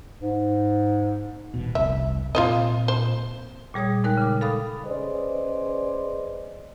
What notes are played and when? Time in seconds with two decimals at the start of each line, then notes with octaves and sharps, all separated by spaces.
0.20 G#2
1.54 D#1 B2
1.75 F1 C2 E5
2.35 A#2 C4 F4 C5 D#5
2.88 C5
3.74 A#2 G3 G#4 C#5 D#6
4.04 G#3 D#4 A#4 G5 F#6
4.17 C#3 D6
4.41 A4 F5 B5 D#6
4.86 C#4 G#4 B4 C5 D5 D#5